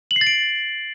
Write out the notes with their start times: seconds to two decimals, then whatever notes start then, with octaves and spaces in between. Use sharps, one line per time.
0.11 F#7
0.16 C7
0.21 A6
0.27 D7